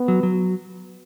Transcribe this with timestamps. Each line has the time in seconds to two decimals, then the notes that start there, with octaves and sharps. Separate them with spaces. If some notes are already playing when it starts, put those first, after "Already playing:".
Already playing: B3
0.08 F#3
0.23 F#3